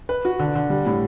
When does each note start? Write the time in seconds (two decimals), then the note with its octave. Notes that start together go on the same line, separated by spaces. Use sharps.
0.09 B4
0.25 F#4
0.39 D3
0.55 D3
0.70 G3
0.86 A2